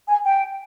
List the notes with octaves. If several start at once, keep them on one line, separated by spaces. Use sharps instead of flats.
G#5
G5